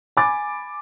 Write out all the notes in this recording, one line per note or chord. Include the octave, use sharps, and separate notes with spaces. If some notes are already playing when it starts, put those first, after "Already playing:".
G#5 B5 D6 A6